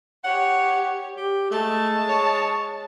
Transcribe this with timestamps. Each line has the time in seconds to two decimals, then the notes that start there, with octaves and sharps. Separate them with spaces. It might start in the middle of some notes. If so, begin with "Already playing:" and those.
0.24 G4 C#5 F#5
1.16 G4
1.51 G#3 A3 A5
2.08 C#5